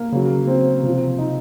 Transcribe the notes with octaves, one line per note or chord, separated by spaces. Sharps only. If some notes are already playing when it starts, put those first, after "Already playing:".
Already playing: A#3
C#3 F#3
C4
C3 F3
D#4